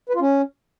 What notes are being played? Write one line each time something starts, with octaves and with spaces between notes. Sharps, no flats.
B4
F4
C#4